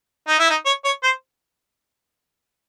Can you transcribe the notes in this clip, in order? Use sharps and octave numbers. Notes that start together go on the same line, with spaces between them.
D#4
E4
D#4
C#5
C#5
C5